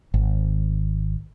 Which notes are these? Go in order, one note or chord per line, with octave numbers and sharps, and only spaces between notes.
G#1